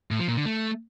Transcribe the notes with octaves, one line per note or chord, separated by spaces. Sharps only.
A2
F3
A#2
D3
A3